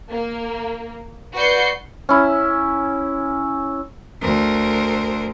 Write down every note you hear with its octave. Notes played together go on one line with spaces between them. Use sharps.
A#3
F#4 B4 D5 G6 C7 C#7
C#4 E4
D2 A#4 C5